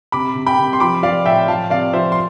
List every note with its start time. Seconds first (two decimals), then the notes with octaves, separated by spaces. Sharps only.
0.12 C3 B5 D6
0.35 C3
0.47 G5 B5
0.58 C3
0.73 C6
0.80 F3 B5 D6
1.03 F3 D5 F5
1.26 A2 E5 G5
1.48 F3 F5 A5
1.70 C3 D5 F5
1.93 F3 C5 E5
2.12 C6